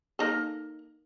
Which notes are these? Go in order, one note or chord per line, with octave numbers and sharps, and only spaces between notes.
A#3 D#4 A4